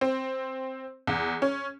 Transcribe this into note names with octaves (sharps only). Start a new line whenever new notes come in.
C4
E2
C#4